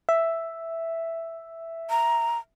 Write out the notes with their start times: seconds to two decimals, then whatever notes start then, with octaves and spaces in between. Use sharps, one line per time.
0.09 E5
1.90 A#5